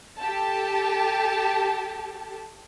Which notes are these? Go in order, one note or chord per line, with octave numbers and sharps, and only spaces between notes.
G4 A4 A5